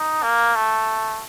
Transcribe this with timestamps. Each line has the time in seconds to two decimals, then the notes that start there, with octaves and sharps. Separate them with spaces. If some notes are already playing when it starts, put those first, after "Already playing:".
Already playing: D#4
0.23 A#3
0.55 A3